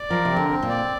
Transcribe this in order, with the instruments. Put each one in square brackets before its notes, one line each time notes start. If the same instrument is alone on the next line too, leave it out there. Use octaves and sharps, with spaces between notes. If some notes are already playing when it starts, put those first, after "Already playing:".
Already playing: [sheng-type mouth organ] D5
[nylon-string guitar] F3 [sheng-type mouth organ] A#4
[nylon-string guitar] C3
[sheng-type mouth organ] C4
[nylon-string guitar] D3
[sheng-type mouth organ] C4
[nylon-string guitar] A#2
[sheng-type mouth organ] D5